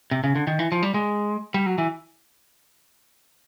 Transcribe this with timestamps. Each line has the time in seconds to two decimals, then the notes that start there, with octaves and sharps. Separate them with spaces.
0.11 C3
0.24 C#3
0.36 D3
0.47 D#3
0.59 E3
0.72 F3
0.83 G3
0.94 G#3
1.54 G3
1.66 F#3
1.78 E3